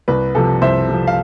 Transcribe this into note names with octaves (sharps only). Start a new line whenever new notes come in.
C2 B4
C3 F3 A4
C2 C5 E5
C3 F3
F5